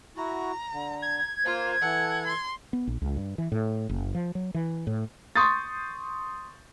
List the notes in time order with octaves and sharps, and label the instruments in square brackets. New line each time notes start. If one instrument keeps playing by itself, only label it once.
[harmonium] E4 F#4 [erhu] A#5
[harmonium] D3
[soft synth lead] G#6
[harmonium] A#3 C5 [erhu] F4
[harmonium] E3 A4 [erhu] F#5
[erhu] C6
[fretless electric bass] B3
A#1
C#2
G2
E3
A2
F#1
F3
F#3
E3
A2
[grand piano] C6 C#6 D#6 G6 A6